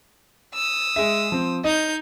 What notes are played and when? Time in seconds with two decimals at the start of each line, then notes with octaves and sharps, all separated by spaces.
0.54 D#6 E6
0.96 G#3 G#4 E5
1.32 F3 C4
1.64 D#4 D#5 G6